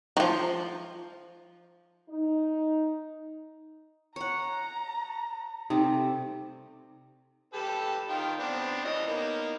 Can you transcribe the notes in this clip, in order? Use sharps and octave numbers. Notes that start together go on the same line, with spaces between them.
D#3 F3
D#4
C#5 F#5 A#5
C3 G3 A3 D#4
G4 A4 B4
D#3 F4 G5
B3 C4 D4
E3 C#4 D#5
A#3 B3 D#4